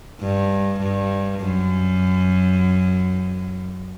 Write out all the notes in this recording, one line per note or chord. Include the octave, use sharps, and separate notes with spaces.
G2
G2
F#2